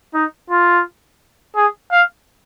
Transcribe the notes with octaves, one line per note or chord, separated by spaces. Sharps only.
D#4
F4
G#4
F5